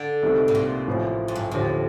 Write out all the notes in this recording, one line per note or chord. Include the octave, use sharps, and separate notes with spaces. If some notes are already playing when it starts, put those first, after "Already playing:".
Already playing: D3
C2 C3 D#3 A3
A2
A#2
A1 A2 F3
F2
G2
D#2 A2 D3 F3